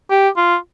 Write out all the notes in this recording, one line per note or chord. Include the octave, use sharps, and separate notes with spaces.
G4
F4